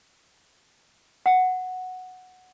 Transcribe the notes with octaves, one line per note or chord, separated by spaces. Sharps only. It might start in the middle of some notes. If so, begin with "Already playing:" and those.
F#5